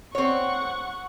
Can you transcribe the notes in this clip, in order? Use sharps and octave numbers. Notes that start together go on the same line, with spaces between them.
C4 C#5 F#5 C#6